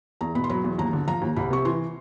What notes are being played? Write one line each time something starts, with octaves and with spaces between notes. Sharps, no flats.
E2 A#5
B2 B5
C6
F#3 B5
E2
D#2 A#5
D3
F3 A#5
D#2
C2 B5
C3 C#6
E3 C6